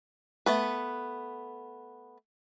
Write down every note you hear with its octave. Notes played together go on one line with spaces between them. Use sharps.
A3 B3 B4